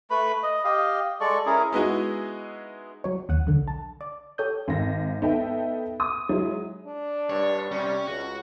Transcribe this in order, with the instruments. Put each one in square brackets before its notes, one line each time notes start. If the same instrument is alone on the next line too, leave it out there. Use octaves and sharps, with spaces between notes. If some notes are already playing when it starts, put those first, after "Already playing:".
[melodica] A3 B4 B5
D#5
G4 D#5 F5
G#3 A4 D5 C#6
C#4 E4 G#4 A#4
[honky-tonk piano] G#3 B3 D#4 E4 F#4 G#4
[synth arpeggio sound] F#3 C#5
D#2 F#5 D#7
B1 D3
A5
D5
G4 A4 C#5 D#6 G6
[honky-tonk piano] G#1 A#6
B3 D#4 A4 B4 E5 G5
D#6
F#3 G#3 E4
[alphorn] D4
[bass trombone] G2 [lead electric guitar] C#5 [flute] D5
[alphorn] C3 [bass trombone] G3 [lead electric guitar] C#4
[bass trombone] C#2 [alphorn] C#3 [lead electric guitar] F#4